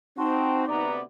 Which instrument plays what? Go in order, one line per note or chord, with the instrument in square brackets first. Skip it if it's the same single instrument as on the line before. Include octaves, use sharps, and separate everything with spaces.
[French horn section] C4 [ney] D#4 [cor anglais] F#4 [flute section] G5 A5 C6
[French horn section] D2 C3 B3 [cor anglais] D5 [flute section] A#5